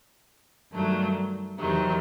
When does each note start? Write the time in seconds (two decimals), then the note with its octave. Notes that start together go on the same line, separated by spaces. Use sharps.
0.71 G2 D#3 F#3 A3
1.58 E2 C3 D#3 F#3